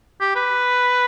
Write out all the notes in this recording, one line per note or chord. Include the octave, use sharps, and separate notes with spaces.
G4
B4